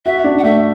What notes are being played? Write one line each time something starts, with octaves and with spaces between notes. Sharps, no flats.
F#4 E5
D4
F#5
A3 E5